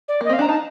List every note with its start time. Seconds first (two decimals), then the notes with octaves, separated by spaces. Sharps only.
0.08 D5
0.21 A#3 D#5
0.29 C4 F5
0.39 D4 A#5
0.48 D#4 A5